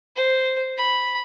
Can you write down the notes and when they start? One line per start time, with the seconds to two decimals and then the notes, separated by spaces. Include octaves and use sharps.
0.16 C5
0.77 B5